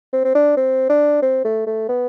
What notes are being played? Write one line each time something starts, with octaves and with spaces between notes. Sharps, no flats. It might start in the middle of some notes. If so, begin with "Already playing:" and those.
C4
C4
D4
C4
D4
C4
A3
A3
B3